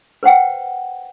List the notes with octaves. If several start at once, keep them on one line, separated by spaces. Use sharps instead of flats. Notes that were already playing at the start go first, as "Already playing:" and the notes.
B4 C5 F#5 G5